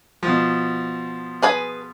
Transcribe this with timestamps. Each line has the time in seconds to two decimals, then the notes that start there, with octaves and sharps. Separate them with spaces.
0.23 B2 F3
1.42 G#4 B4 G#5